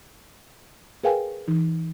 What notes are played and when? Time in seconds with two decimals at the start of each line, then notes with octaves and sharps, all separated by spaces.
1.04 G#4 A#4 B4 F5 G5 G#5
1.48 E3 D#4